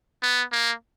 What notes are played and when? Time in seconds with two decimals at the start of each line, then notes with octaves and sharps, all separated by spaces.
0.23 B3
0.52 A#3